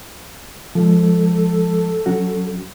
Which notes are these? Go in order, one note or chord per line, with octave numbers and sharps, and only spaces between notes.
F3 G#3 A4
F#3 C#4 F#4